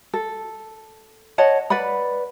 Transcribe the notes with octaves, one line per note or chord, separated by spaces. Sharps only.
A4
C#5 D#5 F#5 A5
B4 D5 F#5 B5